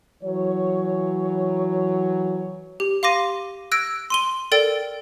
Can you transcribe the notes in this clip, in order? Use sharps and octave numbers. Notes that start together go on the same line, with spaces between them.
E3 F#3 C#5
G4
F5 C6 D6 A#6 D#7
E6 F#6 G#6 A#6 D7
C6 D#7 G7
A4 A#4 D5 G5 A6 D7